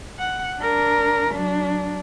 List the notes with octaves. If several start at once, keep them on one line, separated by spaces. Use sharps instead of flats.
F#5
D4 A#4
F#3 D4